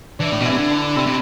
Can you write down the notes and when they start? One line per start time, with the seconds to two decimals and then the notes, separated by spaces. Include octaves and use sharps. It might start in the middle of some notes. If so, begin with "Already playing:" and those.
0.19 E3 D4 D5
0.32 A2
0.41 B2
0.45 C3 E3 E4
0.58 D3
0.70 D4 D5
0.96 C3 E4 E5
1.07 C3